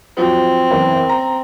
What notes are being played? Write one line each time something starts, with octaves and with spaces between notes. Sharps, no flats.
F3 F#3 C4
F#1 E2
A#5